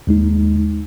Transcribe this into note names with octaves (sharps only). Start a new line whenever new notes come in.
D#2 G#3 D#4